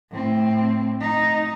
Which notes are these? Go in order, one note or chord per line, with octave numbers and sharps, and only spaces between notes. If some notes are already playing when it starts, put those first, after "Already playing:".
A2 C4
D#4